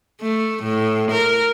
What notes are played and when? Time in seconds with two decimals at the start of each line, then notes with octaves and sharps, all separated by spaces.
0.21 A3
0.63 A2
1.12 A#4